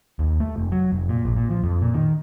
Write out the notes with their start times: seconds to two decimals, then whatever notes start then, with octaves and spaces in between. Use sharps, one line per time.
0.19 D#2
0.40 A3
0.56 F1
0.72 F#3
0.92 F1
1.09 A#2
1.25 A#1
1.37 A#2
1.51 F3
1.64 F2
1.81 A#2
1.94 D#3